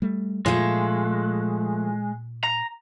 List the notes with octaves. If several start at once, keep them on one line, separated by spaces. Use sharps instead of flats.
G3 A3
A#2 F3 G#3 A3
A#5